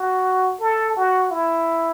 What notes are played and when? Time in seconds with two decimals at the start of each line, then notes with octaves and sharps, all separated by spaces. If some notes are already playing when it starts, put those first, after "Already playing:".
Already playing: F#4
0.60 A4
0.97 F#4
1.31 E4